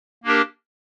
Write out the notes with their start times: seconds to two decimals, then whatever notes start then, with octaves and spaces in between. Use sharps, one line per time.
0.24 A#3 D4 G4 A#4